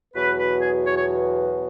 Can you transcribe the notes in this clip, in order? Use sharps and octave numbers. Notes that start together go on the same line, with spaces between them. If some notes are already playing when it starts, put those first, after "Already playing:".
E2 B2 F#3 B4
B4
G#4
C#5
C#5